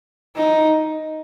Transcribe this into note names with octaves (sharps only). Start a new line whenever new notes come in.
D#4